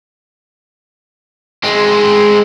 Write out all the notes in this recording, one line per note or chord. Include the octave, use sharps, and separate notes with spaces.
G#3 C4